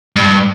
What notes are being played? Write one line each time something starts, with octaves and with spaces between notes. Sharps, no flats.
G2